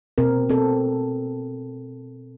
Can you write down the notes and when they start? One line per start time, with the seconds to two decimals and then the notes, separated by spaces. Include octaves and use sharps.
0.18 B2 C4 A#4
0.49 C4 A4